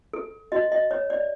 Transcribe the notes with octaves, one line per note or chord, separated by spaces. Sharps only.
A4
F#4 D#5
D#5
C#5
D5